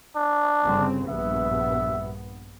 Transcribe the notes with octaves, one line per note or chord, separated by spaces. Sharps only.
D4
G1 C#3 C4
A#1 G2 B3 E5